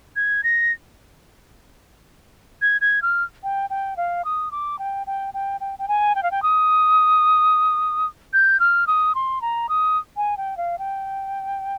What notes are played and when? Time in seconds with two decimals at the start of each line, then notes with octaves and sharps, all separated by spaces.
0.16 G#6
0.44 A#6
2.62 G#6
2.81 G#6
3.02 F6
3.43 G5
3.70 G5
3.97 F5
4.25 D#6
4.51 D6
4.79 G5
5.07 G5
5.34 G5
5.61 G5
5.79 G5
5.88 G#5
6.15 G5
6.23 F5
6.31 G5
6.43 D#6
8.33 G6
8.60 F6
8.87 D#6
9.15 C6
9.42 A#5
9.69 D#6
10.17 G#5
10.37 G5
10.57 F5
10.78 G5